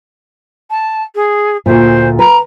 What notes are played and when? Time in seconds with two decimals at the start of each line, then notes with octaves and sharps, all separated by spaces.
0.70 A5
1.15 G#4
1.66 D2 A#2 C5
2.19 B4 A#5